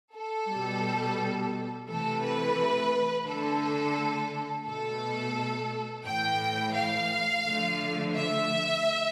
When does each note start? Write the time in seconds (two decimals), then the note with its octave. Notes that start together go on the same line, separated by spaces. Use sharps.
0.15 A4
0.48 B2 G3
1.88 C3 E3 A3 A4
2.22 B4
3.27 D3 A3 A4
4.66 B2 A3 A4
6.05 A2 E3 A3 G5
6.74 F5
7.45 D3 F3 A3
8.14 E5